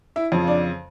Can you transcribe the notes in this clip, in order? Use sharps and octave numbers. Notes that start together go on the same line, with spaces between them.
E4 E5
F2 C#3 F3
D4 D5